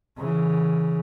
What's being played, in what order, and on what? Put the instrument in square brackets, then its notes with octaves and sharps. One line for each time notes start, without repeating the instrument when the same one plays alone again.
[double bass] C#3 E3